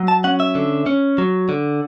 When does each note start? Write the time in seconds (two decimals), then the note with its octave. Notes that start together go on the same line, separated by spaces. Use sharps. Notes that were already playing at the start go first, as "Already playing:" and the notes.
Already playing: F#3
0.08 A5
0.24 C#4 F#5
0.40 E5
0.55 D3
0.86 C#4
1.18 F#3
1.49 D3